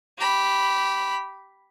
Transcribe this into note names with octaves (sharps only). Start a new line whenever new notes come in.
G4 B5